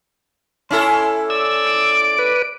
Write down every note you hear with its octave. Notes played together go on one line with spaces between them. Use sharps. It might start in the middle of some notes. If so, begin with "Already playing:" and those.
C#4 E4 A4 C6
D5 E6
D7
B4